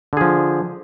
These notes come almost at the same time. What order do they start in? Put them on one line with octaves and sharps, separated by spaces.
D3 G#4 F3